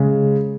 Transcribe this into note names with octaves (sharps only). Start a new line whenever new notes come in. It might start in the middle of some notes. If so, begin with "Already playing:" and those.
Already playing: C#3 G#3